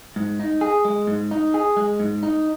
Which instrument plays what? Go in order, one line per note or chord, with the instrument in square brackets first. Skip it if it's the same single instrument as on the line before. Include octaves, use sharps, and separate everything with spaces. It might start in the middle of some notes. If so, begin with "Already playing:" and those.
[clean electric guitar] G#2
D#4
G#4
G#3
G#2
D#4
G#4
G#3
G#2
D#4